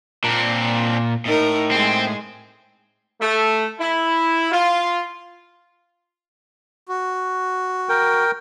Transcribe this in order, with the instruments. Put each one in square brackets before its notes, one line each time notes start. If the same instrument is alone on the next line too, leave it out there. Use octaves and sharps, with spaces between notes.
[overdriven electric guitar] A#2 [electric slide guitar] C4 D4
[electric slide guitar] A2 [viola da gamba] D#4 A#4
[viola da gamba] G#3 G#4 [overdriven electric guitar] C4
[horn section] A3
E4
F4
[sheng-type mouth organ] F#4
[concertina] A#4 G5